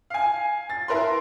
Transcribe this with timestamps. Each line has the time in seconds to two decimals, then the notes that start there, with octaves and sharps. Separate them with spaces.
0.10 F5 G#5
0.70 A6
0.88 E4 A#4 B4 C6